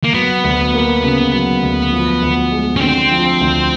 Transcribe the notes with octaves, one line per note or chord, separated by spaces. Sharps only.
A#3
F#3 B3
D2
A#3
C#3
F#3
D2
F3
D2
G#3
C#4
D3 C4
F3
D2